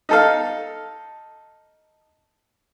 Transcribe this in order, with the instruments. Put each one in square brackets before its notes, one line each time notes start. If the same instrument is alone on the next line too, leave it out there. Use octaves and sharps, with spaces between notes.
[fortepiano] D#4 A4 F5